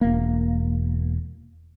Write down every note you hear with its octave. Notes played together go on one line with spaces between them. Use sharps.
E1 A#3